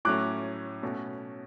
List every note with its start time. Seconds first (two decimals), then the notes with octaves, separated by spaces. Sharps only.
0.05 A2 F#3 A3 C#4 D6 F#6
0.83 B2 A3 C#4